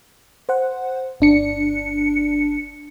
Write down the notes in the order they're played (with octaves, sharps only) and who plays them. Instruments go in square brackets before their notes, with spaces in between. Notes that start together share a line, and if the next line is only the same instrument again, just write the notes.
[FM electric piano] C5 F#5
G1 D4 C#7